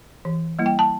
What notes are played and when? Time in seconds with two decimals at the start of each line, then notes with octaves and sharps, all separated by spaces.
0.25 E3
0.59 G3 A#3 E4
0.66 G5
0.79 A5